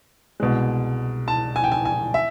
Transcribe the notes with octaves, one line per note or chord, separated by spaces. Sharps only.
C2 B2 G#3
A5
G#5
G5
G#5
G#5
E5